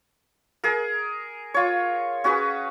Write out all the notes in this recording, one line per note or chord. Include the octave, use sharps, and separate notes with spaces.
G#4 A#4
F4 C#5
C#4 F#4 G#4 B4